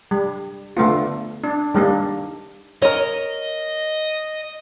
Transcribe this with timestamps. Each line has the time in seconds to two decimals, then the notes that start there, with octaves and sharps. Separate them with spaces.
0.11 G3
0.77 D3 A3 B3 F4
1.44 D4
1.74 D#3 G3 A#3 D4
2.82 A#4 C#5 D#5